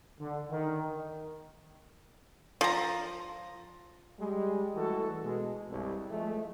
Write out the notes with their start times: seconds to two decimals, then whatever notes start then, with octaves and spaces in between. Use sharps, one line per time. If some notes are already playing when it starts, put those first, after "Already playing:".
0.20 D3
0.50 D#3
2.61 F3 A#5
4.20 G3 G#3
4.75 E3 A3 F#4 A4
5.24 B2 G#3
5.71 C2 G2
6.10 F3 G#3 A3